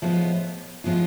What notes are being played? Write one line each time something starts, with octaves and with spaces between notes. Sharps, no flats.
A2 F3 G#3 B3 F4
A2 F3 G#3 B3 F4